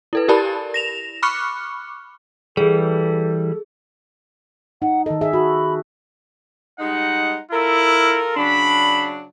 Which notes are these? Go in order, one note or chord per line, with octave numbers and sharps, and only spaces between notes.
E4 A4 B4
E4 G4 A#4 D5 A5 B5
A#6 E7 F7
B5 C#6 D6 F6 F#6 C#7
E3 G3 G#4 A4
D#4 F#5
D#3 A4 D#5
G#4 E5
F#4 B5
G3 G#3 D#4 F#5
E4 F4 A4 A#4
C#3 F#3 D4 B5